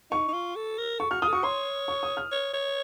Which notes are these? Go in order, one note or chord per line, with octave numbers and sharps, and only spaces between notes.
D#4 C#6
D#4
F4
A4
A#4
A4 C#6
F#4 F6
F4 D#6
A4
F#4 C#6
C#5 C6
C#6
D#6
F6
C#5
C#5